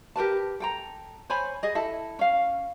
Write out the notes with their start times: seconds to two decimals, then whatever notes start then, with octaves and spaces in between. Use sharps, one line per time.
0.16 G4 A#4 B4 A5
0.60 A4 G5 A#5
1.30 C5 C#5 G#5 B5
1.63 G#4 D#5
1.75 E4 A4
2.19 C#4 F5